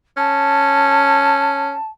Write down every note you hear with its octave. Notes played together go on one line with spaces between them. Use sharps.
C#4 A5